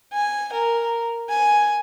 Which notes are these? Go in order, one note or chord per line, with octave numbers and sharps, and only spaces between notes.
G#5
A#4
G#5